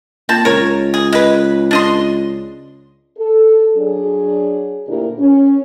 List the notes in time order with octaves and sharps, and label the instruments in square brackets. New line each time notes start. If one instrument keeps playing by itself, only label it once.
[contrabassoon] A#2 [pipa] C4 A5
[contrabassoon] C#2 [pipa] A#4 C#5
[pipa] G#4
G#3 B4
D4 D#5 C6
[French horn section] A4
F#3 D4 G#4
D2 A#2 D4 E4 G4 A#4
C#4